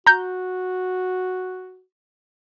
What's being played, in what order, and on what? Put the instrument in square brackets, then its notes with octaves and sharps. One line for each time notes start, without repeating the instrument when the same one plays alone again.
[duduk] F#4 [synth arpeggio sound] A#5 G6